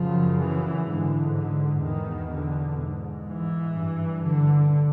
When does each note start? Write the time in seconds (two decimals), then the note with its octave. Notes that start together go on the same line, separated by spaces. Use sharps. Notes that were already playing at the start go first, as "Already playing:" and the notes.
Already playing: F#2 C#3 F3
0.39 E3
0.87 G#2 D3
1.35 D3
1.83 E2 B2 D#3
2.31 D3
2.79 G#2
3.28 E3
3.76 G2
4.24 D3